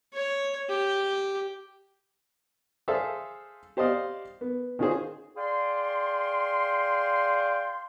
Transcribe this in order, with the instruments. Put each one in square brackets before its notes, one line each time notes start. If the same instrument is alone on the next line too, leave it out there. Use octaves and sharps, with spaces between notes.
[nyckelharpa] C#5
G4
[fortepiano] G#4 A4 C5 E5 F5
G4 C5 D5 D#5 F5
B3
D#3 C#4 F4 F#4 G#4 C5
[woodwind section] G#4 D5 F5 G5 C6